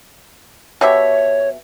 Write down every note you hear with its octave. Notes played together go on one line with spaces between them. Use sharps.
B2 G4 C#5 E5